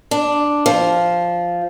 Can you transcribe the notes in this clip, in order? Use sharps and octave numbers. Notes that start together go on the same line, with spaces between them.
D4
F3